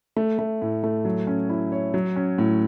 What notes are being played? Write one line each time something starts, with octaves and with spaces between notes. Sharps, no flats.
A3
A3
A2
A3
F#3
C#4
E4
C#5
F#3
C#4
A2